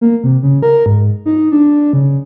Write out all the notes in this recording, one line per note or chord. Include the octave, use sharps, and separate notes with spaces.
A#3
C3
C#3
A#4
G#2
D#4
D4
C#3